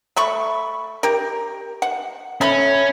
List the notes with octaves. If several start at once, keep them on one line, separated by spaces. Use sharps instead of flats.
A3 B5 C#6
G4 A#4
F#5
A3 C#4 B5